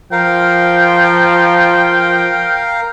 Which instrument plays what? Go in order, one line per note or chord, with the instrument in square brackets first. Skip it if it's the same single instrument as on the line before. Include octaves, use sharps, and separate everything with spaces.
[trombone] F3 [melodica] A#4 F5 [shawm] G5